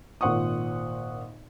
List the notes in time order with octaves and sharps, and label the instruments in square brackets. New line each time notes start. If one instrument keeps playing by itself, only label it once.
[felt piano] G#1 A#2 C5 F#5 C#6 D#6